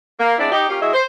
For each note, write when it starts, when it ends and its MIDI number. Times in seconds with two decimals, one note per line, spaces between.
0.19 0.34 58
0.38 0.49 56
0.38 0.49 59
0.38 0.49 60
0.38 0.49 62
0.38 0.49 64
0.38 0.49 74
0.52 0.67 63
0.52 0.67 67
0.69 0.81 58
0.69 0.81 61
0.69 0.81 65
0.69 0.81 67
0.81 0.91 56
0.81 0.91 64
0.81 0.91 66
0.81 0.91 68
0.81 0.91 75
0.81 0.91 76
0.94 1.02 72